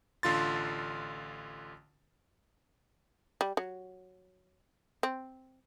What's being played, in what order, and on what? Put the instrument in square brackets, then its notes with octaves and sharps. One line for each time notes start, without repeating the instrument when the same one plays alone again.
[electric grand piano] A1 D3 F4 C6 A6
[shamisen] G3
F#3
C4